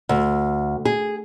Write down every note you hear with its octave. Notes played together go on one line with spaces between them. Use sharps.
D2
G#4